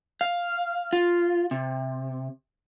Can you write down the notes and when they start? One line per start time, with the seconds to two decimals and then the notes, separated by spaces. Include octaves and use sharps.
0.21 F5
0.93 F4
1.51 C3